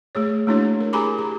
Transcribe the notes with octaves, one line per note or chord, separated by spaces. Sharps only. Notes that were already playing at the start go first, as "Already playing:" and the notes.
A3 G#4 C#5
A3 A#3 D4 E4 F#4 C#5
A#4
G4 G#4 G#5 A#5 B5 D6
G4